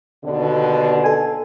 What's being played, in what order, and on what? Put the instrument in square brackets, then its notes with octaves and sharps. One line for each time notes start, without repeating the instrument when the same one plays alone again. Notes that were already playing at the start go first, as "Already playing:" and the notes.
[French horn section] D#2 B2 D3
[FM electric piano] A4 G#5